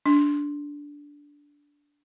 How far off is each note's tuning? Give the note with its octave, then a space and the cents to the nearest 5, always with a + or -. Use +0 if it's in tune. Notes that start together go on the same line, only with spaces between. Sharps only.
D4 -10